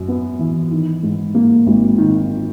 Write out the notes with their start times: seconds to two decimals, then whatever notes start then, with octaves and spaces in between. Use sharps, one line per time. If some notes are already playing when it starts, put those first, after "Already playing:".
Already playing: F#2
0.08 B3
0.39 E3
0.71 D#3
1.03 G#2
1.35 A#3
1.67 G#1
1.98 D#3